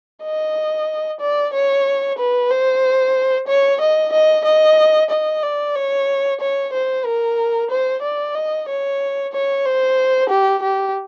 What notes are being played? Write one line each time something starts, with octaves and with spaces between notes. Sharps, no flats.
D#5
D5
C#5
B4
C5
C#5
D#5
D#5
D#5
D#5
D5
C#5
C#5
C5
A#4
C5
D5
D#5
C#5
C#5
C5
G4
G4